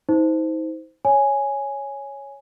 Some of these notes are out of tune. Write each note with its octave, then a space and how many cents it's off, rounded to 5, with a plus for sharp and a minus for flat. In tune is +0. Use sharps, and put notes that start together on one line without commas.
D#4 +45 C5 -15
C#5 +0 G#5 +0